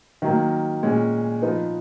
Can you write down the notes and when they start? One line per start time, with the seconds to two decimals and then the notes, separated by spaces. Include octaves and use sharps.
0.22 D#3 F#3 A#3
0.83 A#2 G#3 C#4
1.42 F3 B3 D#4